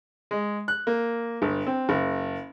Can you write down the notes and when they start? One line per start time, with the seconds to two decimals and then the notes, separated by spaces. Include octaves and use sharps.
0.31 G#3
0.68 F#6
0.87 A#3
1.42 G1
1.67 C4
1.89 F#1